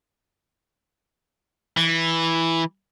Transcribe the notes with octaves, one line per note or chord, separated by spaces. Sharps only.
E3